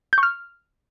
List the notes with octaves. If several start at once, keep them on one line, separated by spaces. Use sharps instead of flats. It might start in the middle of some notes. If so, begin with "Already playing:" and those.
G6
C#6
F6